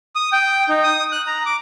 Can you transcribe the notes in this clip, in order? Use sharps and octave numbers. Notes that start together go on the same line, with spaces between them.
D#6
G5
D#4
D#6
F#6
A#5
D6